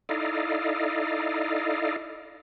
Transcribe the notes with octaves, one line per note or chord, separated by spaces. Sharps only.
D#4 E4 A4 D5 D#5 F5